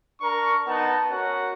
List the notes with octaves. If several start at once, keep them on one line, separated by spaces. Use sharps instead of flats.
D4 A#4 A#5 C#6
B3 D#4 F#5 A5
C#4 F#4 A#4 F#5